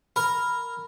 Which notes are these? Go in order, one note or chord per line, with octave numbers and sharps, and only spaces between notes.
A#4 B5